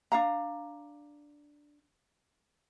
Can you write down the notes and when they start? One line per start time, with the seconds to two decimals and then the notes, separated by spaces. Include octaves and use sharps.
0.12 D4 F5 A#5